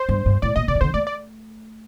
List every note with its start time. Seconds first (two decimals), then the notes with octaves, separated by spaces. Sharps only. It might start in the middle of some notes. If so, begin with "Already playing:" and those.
Already playing: C5
0.09 G2
0.26 G2
0.42 A2 D5
0.56 A#2 D#5
0.68 C3 D5
0.75 D#3
0.81 D3 C5
0.94 A3 D5
1.07 D5